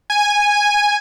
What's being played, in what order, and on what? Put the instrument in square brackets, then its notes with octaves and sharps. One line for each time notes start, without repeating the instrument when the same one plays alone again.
[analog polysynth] G#5 D#7